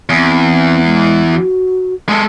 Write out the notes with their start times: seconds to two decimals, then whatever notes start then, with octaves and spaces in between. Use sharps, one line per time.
0.10 E2 C4
0.85 G#3
1.32 F#4
2.09 G#3 A4